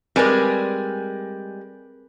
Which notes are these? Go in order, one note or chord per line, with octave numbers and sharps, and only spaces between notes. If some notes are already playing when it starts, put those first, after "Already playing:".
G3 G#3 C4 A#4 B4 D5 G#5